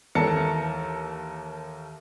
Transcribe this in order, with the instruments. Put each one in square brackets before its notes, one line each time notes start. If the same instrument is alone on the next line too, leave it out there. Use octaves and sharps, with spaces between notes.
[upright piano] D#2 E3 A4 A#4 A5 C#7